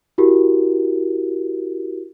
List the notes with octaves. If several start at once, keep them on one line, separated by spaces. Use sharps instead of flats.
E4 F#4 G4 A#4